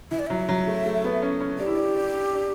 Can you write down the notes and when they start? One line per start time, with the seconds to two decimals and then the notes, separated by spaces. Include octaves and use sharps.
0.11 E3 E5
0.19 D5
0.27 F#3 E5
0.49 F#3
0.67 A3
0.86 A3
1.04 B3
1.22 C#4
1.40 C#4
1.58 D4 G4
1.67 E4
1.75 D4
1.95 D4
2.33 D4